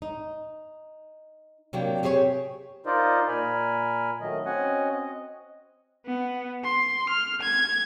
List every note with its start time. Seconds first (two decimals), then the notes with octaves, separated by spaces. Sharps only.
0.02 D#4
1.73 C3 F#3 A#3 D4 G5
2.03 C4 G4 G#4 C5 C#5
2.86 D#4 F4 A#4 C5 D5 D#5
3.28 A#2 A#4 G#5 B5 F6
4.20 D#3 F#3 A3 D#5
4.45 C4 C#4 F#4 D#5 F#5 G#5
4.91 C4 D#5
6.06 B3
6.64 C6
7.10 F6
7.41 G#6